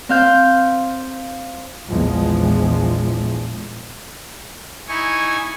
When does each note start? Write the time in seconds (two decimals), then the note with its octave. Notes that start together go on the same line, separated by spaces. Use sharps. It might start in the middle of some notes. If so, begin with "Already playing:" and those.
0.09 C4 F5 G6
1.86 A#1 E2 F3 G#3
4.88 D#4 E4 G#5 C#6